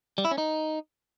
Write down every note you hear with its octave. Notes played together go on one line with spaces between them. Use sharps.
G3
E4
C#4
D#4